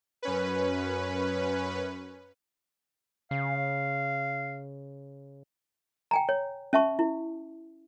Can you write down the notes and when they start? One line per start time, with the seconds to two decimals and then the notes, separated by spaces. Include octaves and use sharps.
0.22 F#2 C#4 B4
3.31 C#3 F5
6.11 G5 G#5 A#5
6.29 C#5
6.73 C#4 E5 A5 C#6
6.99 E4